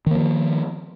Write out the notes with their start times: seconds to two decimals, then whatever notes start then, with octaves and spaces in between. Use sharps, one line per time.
0.07 D#3
0.11 A#3
0.15 F3